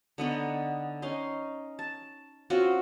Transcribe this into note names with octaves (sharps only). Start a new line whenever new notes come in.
D3 B3 D#4 C#5
C#4 D#4 C6
A5
C4 C#4 F4 F#4